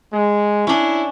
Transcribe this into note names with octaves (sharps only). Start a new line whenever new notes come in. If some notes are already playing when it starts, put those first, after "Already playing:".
G#3
C#4 D4 E4